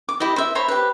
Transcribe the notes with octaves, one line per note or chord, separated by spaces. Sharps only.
D6
E4 G4 D#5
C5 E5
C5 C#5 A#5 B5
G4 B4